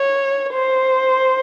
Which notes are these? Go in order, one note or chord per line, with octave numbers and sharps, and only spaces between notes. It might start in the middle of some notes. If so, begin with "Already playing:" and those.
Already playing: C#5
C5